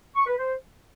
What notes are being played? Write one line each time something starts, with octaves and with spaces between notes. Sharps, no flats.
C#6
B4
C5